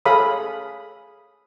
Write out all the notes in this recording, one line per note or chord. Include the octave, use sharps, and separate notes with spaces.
G#4 A4 C#5 F5 B5 D#6